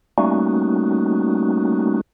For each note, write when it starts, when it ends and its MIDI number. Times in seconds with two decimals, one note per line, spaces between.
0.18 2.01 55
0.18 2.01 57
0.18 2.01 58
0.18 2.01 61
0.18 2.01 63
0.18 2.01 66